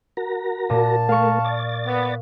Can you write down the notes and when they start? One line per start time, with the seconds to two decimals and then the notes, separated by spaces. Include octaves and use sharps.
0.17 F#4 A#4 A#5
0.70 A#2 A5
1.09 A3 A#4 F5 C#6
1.45 D5 A6
1.86 B3